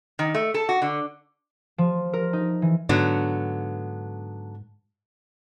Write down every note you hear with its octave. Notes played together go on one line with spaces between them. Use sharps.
D#3
A3
A4
F#4
D3
F3
A#4
D#4
E3
G#2 D3 F#3 B3